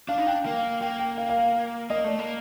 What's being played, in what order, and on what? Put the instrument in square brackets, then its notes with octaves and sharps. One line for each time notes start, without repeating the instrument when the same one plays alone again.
[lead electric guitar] D4 [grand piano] F5
[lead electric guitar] D#4
[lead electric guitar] D4 [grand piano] G5
[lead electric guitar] A#3 [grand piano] F5
[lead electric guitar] A#3 [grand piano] G5
[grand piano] G5
F5
F5
[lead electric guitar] A#3 [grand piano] D#5
[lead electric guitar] A3 [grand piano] D5
[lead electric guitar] A#3